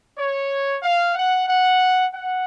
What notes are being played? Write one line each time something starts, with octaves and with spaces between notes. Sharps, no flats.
C#5
F5
F#5
F#5
F#5